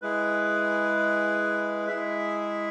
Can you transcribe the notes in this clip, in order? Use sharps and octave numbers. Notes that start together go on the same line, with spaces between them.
G#3 E4 G#4 B4
G#3 E4 G#4 E5